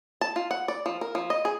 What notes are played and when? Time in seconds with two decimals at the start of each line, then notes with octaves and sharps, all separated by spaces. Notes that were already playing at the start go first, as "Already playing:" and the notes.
0.21 A5
0.36 F4
0.51 F#5
0.68 D5
0.86 F3
1.01 A#4
1.15 F3
1.30 D#5
1.45 G#4